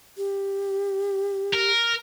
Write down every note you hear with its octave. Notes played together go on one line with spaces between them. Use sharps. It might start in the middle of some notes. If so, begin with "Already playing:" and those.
G4
A#4